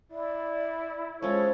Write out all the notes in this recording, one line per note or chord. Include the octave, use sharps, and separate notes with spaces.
E4 D5
F3 G#3 C#4 A4 C#5